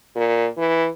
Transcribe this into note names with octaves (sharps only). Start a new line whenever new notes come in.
A#2
E3